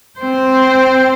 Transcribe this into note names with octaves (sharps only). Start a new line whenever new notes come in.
C4 C5